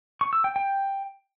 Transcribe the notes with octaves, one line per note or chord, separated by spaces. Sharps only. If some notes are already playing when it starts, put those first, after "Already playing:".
C#6
E6
G5
G5